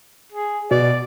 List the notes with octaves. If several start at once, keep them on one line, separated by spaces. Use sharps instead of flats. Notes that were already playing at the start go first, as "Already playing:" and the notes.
G#4
B2 D5